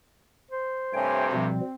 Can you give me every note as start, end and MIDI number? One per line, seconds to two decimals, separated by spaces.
0.52 1.51 72
0.94 1.49 43
0.94 1.49 48
0.94 1.49 57
0.94 1.24 73
0.94 1.24 79
0.94 1.30 80
1.32 1.60 47
1.32 1.60 53
1.32 1.60 55
1.32 1.74 60